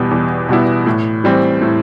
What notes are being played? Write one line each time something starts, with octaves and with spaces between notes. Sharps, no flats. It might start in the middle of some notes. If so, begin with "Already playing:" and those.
Already playing: E2 B2 G3 B3 E4
E2
B2 G3 B3 E4
A2
E3 G3 C4
A2